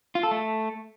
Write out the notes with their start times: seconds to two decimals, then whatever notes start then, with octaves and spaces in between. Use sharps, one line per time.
0.15 F4
0.23 A4
0.31 A3